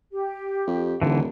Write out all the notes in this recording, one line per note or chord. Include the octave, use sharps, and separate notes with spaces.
G4
F2
D#1 D3 E3